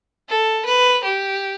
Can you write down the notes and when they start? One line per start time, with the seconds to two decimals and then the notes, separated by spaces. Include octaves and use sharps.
0.29 A4
0.65 B4
1.04 G4